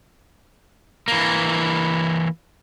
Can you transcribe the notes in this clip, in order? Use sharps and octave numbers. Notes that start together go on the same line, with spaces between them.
E3 A#3